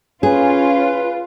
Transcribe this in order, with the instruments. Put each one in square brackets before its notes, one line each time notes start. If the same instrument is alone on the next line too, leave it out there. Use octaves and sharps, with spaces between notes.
[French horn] C#4 [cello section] F4 [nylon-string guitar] G#4 [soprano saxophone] B4